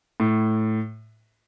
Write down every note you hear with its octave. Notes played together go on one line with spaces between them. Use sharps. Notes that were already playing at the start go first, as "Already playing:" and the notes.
A2